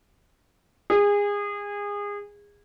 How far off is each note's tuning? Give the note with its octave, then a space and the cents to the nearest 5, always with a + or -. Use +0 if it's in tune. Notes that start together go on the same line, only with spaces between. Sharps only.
G#4 -25